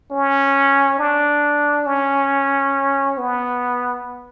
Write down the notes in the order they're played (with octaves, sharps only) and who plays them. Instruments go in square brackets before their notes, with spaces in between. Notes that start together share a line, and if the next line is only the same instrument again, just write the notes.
[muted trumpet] C#4
D4
C#4
B3